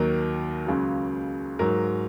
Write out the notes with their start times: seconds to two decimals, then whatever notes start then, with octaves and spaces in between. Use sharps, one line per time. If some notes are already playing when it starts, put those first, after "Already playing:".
Already playing: D#2 D#3 F#3 A#4
0.66 C#2 C#3 F#3
1.59 G#2 F#3 A#4